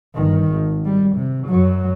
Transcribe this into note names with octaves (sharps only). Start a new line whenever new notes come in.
G1 D#3
G#1
G3
C3
F#2 F#3